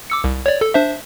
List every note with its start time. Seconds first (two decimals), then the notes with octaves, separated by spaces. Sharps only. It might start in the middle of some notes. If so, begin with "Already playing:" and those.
0.10 D6 E6 C#7
0.24 C2
0.46 C#5 D5
0.61 A4
0.74 D4 C5 E5